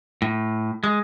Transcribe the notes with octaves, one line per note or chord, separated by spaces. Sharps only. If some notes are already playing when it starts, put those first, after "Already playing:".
A2
G#3